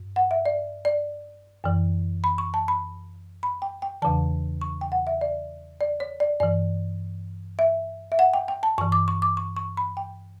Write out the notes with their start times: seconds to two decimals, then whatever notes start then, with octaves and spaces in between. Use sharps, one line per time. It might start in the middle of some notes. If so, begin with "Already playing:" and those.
Already playing: G2
0.16 F#5
0.31 E5
0.46 D5
0.85 D5
1.64 F#2 E3
2.24 B5
2.38 C#6
2.54 A5
2.68 B5
3.43 B5
3.62 G5
3.82 G5
4.02 E2 C#3 E3 A5
4.61 C#6
4.81 G5
4.92 F#5
5.07 E5
5.21 D5
5.81 D5
6.00 C#5
6.20 D5
6.40 G2 E3 D5
7.59 E5
8.12 E5
8.19 F#5
8.34 G5
8.48 G5
8.63 A5
8.78 G2 E3 C#6
8.92 D6
9.08 C#6
9.22 D6
9.37 C#6
9.56 C#6
9.77 B5
9.97 G5